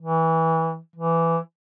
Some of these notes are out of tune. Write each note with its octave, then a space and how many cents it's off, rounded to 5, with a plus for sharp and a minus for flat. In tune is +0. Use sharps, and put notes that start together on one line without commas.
E3 -20
E3 +10